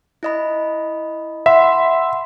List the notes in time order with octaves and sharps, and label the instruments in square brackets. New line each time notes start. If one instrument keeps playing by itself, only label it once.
[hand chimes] E4 D#5 B5
[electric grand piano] E5 [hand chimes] F#5 B5 C6